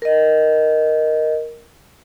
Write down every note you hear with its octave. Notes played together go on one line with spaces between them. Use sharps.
A#4 D#5